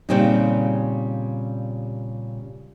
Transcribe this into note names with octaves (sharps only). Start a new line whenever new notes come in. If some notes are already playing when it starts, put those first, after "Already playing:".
A#2 C#3 G3 C4 C#4 D#4